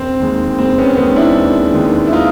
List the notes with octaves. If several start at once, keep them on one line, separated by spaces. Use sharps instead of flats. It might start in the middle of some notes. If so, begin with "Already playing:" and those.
Already playing: E1 C4
D#2 D#3 G#3
E1 C4
B3 C#4
D#2 D#3 G#3 B3
D4 E4
E1
D#2 D#3 G#3
E4
D#4 F4